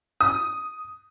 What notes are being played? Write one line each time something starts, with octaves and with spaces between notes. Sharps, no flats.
D#6